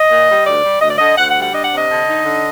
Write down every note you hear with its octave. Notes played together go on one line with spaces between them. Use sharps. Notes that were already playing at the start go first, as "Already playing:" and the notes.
Already playing: D#5
A#2
G3
D2 D5
G3
D2 D#5
D5
D3 D#5
D2 F#5
F#5
G3
F#5
D4 D#5
F#5
C3
D#5
D3
D#4
D3